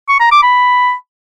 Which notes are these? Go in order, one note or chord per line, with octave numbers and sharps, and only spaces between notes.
C#6
A#5
D6
B5